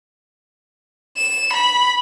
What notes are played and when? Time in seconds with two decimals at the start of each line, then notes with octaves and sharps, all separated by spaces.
1.17 E7
1.53 B5